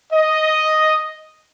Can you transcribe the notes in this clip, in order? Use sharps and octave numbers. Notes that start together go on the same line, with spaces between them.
D#5